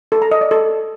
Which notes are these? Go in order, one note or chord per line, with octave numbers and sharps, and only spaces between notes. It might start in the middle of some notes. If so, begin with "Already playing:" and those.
A4
A#5
D#5
D5
A4